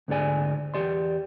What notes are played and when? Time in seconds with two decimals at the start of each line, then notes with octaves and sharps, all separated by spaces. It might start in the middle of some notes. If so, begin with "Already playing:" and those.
0.08 D2 G#2 D3 G#4 D5 G#5
0.74 E2 G4 D5 C6